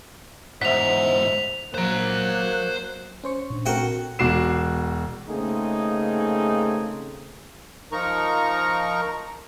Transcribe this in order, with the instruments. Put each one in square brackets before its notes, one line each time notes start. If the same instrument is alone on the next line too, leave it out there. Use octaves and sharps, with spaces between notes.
[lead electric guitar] E2 G#2 [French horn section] C5 [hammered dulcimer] E5 F#5 [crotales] B6 F7
[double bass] F#3 [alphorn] A#3 [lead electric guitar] C5 A#5 [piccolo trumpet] F#6
[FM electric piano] C#4 C5 C#6
[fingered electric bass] A#2 D4
[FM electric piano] C4 A4 A#4 [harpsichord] F#4 F#5 G5
[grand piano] E1 F#4 D6 C7 E7
[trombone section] C#3 A3 A#3 C4 D#4 G#4
[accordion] F3 D#4 A#4 A#5 C#6